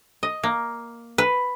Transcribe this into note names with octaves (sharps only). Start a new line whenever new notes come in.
D#5
A#3
B4